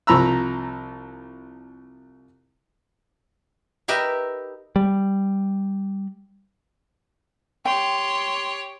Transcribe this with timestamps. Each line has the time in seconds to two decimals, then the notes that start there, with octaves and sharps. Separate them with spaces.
0.07 C2 F3 A#5 B5 E6
3.88 D#4 G4 A#4 B4 E5
4.76 G3
7.65 G4 C#5 G5 C6